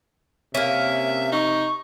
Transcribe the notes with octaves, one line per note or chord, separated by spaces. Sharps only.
C3 A#3 C#4 E5
D#4 C#6